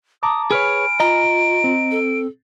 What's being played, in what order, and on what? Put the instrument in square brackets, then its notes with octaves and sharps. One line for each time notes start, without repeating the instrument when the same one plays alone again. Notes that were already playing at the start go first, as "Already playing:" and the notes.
[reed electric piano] A5 A#5 D6 [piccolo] D#6
[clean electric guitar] G#4 B4 C#5 [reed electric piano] G#5 B5 F6 [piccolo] D7
[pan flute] F4 [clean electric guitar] D#5 A#5
[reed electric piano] C4
[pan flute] A4